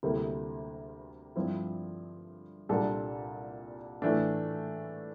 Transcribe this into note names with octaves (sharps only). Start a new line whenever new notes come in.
D2 C3 G3 A#3 E4
G2 F3 C4 E4
C2 A#2 G3 D4 A4
A2 E3 A3 D4